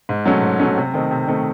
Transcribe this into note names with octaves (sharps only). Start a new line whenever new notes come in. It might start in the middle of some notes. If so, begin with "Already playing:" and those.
G#2
F#3 A3 C#4
G#2
F#3 A3 C#4
C3
D#3 A3 C4 D#4
C3
D#3 A3 C4 D#4